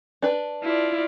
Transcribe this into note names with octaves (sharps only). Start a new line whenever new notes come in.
D4 B4
E4 F4 D5